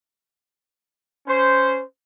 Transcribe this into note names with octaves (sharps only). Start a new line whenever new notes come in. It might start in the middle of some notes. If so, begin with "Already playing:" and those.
C#4 C5